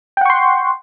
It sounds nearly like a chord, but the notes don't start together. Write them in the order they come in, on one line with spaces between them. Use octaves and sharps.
G5 F#5 C#6 C6